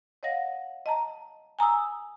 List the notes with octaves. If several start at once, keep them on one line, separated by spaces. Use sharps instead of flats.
C#5 D#5 F5 F#5 A#6
D#5 A5 A#5
G#5 A#5 D#6 E6